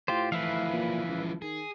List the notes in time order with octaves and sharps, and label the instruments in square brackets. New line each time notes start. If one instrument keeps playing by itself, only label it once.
[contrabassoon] A2 [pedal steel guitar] F4 G4 C5
[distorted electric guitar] E3 F3 [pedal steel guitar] B4 E5 F5
[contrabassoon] A#2
C#2
[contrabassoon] D#3 [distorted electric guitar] G#4